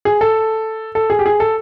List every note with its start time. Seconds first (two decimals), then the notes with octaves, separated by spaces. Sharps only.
0.05 G#4
0.21 A4
0.95 A4
1.10 G#4
1.19 G4
1.26 G#4
1.40 A4